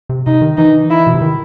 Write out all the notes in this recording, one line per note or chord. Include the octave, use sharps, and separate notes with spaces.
C3
C3 D#4
D#3
E3 D#4
E4
B2
C3
D#3